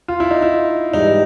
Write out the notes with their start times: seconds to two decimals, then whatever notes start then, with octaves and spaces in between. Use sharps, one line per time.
0.08 F4
0.20 E4
0.31 D#4
0.42 E4
0.94 G#2 E3 G3 D#4